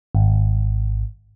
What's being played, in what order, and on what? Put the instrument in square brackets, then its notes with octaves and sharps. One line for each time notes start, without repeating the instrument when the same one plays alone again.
[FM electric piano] G#1